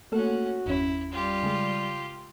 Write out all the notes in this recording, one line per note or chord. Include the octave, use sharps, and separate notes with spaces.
A3 A#3 C#4 F#4 A4 F#5
G1 E2 C#4 E4
G3 F4 G4
C#3 G#3